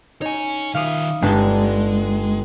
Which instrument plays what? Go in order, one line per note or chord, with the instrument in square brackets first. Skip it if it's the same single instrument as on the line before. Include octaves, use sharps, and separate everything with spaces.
[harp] D#4 [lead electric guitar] C#5 G#5
[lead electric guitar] D#3 E5 [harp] F5 D#6
[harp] G1 D4 A5 [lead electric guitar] G#3